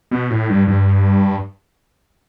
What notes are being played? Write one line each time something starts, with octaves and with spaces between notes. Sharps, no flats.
B2
A2
G2
G2